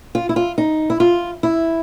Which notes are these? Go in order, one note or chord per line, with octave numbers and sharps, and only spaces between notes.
F4
E4
F4
D#4
E4
F4
E4